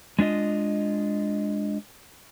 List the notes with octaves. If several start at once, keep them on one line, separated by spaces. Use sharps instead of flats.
G#3 D4 F4 D#5